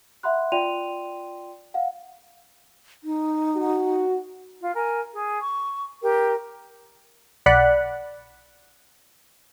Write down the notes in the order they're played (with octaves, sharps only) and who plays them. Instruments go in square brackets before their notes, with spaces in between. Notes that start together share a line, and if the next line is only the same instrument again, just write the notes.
[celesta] E5 F#5 B5 C6 F#6
F4 D5 G5 C6 D#7 F7
F5 F#5
[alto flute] D#4
[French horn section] F#4
[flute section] F4
A#4 G#5
G#4
C#6
G4 A#4 G5
[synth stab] B1 D5 F#5 B5 F#6